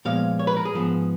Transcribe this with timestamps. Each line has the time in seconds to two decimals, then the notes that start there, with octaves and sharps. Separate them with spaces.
0.05 A#2 F3 G#3 B3 F5
0.39 C#5
0.47 B4
0.57 A#4
0.65 G#4
0.73 G#2 F3 B3